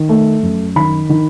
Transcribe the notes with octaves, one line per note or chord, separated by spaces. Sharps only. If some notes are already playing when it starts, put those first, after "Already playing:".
Already playing: D#3
A3
F#2
D#3 B5
D#3